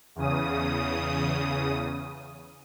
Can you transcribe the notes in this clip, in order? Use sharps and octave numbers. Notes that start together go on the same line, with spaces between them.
E2 C#3 D#6